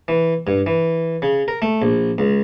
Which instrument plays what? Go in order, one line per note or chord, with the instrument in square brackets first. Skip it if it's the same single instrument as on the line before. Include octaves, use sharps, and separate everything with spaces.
[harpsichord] E3
G2
E3
C#3
A#4
A3
A#1
C#2